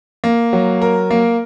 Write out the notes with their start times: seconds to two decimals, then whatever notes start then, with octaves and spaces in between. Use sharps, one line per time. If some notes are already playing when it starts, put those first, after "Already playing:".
0.24 A#3
0.53 F#3
0.82 A#4
1.11 A#3